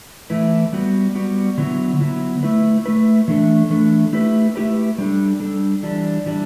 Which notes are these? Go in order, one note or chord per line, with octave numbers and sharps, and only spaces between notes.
E3 A3 E4 B4
G3 B3 F#4
G3 B3 F#4
D3 F#3 B3 E4
D3 F#3 B3 E4
A3 E4 B4
A3 E4 B4
E3 A3 D4 A4
E3 A3 D4 A4
A3 E4 G4 B4
A3 E4 G4 B4
G3 D4 A4
G3 D4 A4
E3 G3 D4
E3 G3 D4